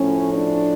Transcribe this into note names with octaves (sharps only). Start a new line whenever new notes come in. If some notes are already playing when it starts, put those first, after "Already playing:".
Already playing: A2 F3 C#4
D4